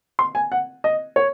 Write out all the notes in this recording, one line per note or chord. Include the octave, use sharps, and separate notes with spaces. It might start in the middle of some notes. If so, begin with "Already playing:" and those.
C6
G#5
F#5
D#5
C#5